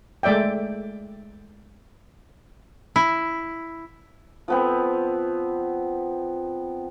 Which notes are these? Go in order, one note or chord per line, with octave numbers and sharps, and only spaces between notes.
G#3 A3 D5 E5 G5
E4
F3 B3 C4